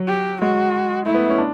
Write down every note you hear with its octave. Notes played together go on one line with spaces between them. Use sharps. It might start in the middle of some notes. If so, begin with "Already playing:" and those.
Already playing: F#3
G4
G#3 F#4
A3 E4
B3
C#4
D4